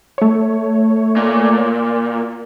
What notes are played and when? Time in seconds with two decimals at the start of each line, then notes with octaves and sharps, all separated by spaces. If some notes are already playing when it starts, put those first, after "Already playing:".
0.18 A3 C#5
1.16 A#2